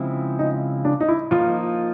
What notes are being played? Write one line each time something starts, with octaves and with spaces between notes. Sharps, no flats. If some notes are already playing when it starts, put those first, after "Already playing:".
Already playing: C#3 F3 G#3 C4 E4
D#4
D4
D#4
E4
F3 A#3 D#4 F4